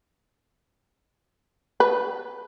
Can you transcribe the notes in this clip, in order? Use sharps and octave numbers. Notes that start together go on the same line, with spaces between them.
B4